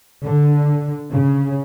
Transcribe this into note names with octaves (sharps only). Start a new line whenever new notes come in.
D3
C#3